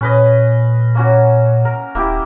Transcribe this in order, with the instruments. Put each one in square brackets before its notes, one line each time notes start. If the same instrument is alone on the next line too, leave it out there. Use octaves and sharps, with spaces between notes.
[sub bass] A#2 [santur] C#4 B4 D#5
[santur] A#3 C#4 F#4
A#4
[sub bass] D#1 [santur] A#3 E4 G4